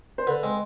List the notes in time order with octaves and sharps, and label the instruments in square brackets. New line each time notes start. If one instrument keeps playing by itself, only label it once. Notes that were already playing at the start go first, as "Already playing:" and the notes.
[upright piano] C5
[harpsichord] D3 [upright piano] B4
[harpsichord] G#3 C4